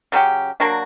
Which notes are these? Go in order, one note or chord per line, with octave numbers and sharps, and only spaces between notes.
C#3 F#3 C#4 G4
F#3 A#3 D4 F#4